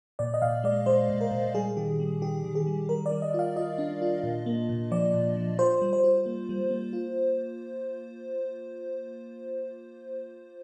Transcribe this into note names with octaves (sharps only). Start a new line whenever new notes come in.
A#2 D5
D#5
A#2 F5
G#3 D5
G#3 C5
A#2
A#4
A#2
G3 G#4
D#3 G4
G3
D#3 G4
D#3
G#4
G3
G3 A#4
D5
G3
D#5
F4 F5
F4 D#5
D4
F4
A#2
A#3
A#2
F3 D5
A#2
F3
F4 C5
G3
C5
F4
A#3
G3
A#3
F4